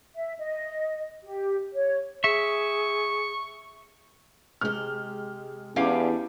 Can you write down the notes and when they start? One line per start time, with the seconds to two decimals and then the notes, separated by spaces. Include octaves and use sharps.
0.15 E5
0.39 D#5
1.25 G4
1.74 C#5
2.24 G#4 E5 C#6
4.61 C3 G#3 G4 F6
5.76 E2 C#4 D4 E4 G4 F5